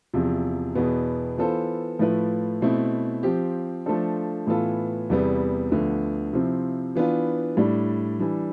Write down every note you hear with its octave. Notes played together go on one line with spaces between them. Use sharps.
E2 C3 F3
E2 B2 B3
E3 B3 F4 A4 C5
A2 F3 A3 E4 B4
B2 A3 C4 E4
F3 C4 G4
F3 A3 D4 A4 C5
A2 E3 B3 F4 A4
E2 C3 G3 B3
D2 D3 F3 B3
C3 F3 C4 E4
E3 B3 D4 F4
A2 G3 D4
E3 G3 D4